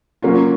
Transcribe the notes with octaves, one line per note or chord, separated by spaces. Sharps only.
F#3 A#3 C#4 F4